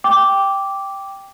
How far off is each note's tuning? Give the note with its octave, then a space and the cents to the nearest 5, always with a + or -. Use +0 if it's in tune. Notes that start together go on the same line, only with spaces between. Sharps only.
G5 +0 D6 -10